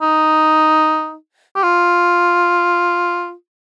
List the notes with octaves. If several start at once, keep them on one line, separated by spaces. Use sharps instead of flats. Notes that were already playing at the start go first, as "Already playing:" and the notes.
D#4
G4
F4